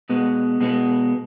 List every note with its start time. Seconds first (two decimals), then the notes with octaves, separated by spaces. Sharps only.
0.09 B2 G#3 B3
0.61 B2 G#3 B3